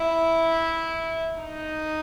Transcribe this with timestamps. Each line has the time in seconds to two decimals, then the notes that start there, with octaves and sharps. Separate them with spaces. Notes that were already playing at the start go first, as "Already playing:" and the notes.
Already playing: E4
1.41 D#4